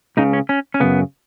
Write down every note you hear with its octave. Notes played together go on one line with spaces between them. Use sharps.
C#2 C#3 D#4
C#4
C#4
C#4
F#2 C#3 B3